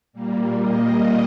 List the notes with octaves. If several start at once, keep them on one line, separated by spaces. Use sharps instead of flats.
A#2 G3 A#3
D#5